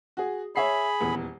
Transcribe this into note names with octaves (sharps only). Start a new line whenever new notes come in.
F#4 G#4
G#4 C#5 E5 B5 C7
D#1 E2